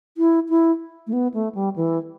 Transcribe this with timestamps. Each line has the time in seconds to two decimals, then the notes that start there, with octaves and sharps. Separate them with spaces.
0.17 E4
0.49 E4
1.07 A3
1.13 B3
1.34 A3
1.55 G3
1.76 E3